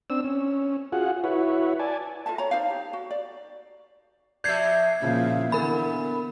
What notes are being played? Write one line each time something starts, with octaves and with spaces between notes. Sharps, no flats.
C4 D4 E6
C#4
F4 F#4 G#4 F#5
E4 F#4 B4 C#5
D5 G#5 A5
F4 A4 E5 A5
C#5 A#5
D#4 C5 D5 F5
G4
F#4
D5
F2 B2 D5 E5 G6 G#6 C7
A#2 C#3 F3 E4
D3 E3 B3 A#4 B5